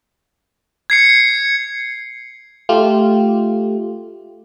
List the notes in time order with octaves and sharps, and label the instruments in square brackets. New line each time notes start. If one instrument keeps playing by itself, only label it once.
[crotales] G#6 C7 C#7
[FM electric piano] A3 F4 G4